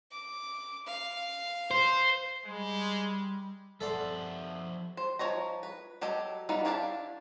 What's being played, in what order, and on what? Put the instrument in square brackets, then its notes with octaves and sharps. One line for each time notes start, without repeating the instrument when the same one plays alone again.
[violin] D6
F5
[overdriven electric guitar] C5
[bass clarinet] G3 [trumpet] G#3
[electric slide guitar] F3 E5 F#5 [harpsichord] A4 D5 C6
[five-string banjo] C5
F3 D4 C#5 D#5 A#5
B4
F#3 G4 A4 D#5
G3 B3 D#4 E4 F5
D4 E4 G4 F5 A5